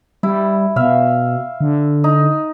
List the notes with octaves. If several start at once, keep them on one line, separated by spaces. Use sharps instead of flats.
G3 E4
B2 E5 F5
D3
D#4